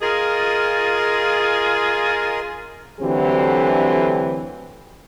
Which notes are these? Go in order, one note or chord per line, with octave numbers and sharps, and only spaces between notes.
F4 G#4 A#4 D#5
D2 D3 E3 F#3 C4 G4